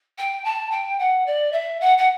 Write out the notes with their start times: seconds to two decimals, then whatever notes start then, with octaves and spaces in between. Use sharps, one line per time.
0.18 G5
0.45 A5
0.71 G5
0.99 F#5
1.26 D5
1.53 E5
1.80 F#5
1.98 F#5